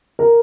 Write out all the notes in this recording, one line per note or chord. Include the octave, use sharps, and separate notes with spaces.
A#4